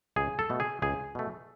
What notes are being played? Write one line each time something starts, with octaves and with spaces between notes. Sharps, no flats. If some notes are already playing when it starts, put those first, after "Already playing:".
C#2 G#4
A4
B2 A3
G#4
C#2 G#4
B2 A3